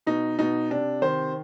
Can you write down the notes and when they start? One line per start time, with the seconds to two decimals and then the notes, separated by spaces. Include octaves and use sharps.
0.07 B2 D#4
0.39 B2 D#4
0.70 C3 D4
1.02 D#3 C5